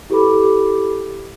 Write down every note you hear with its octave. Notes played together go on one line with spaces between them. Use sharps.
E4 G4 A4 B4 B5 D6